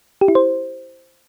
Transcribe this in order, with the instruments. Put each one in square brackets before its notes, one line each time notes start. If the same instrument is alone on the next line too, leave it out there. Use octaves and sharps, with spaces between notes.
[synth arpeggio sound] G4
E4
C5